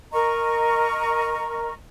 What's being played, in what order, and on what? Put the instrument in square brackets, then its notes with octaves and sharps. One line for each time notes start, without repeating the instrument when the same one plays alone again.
[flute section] A#4 D#5 A#5 C#6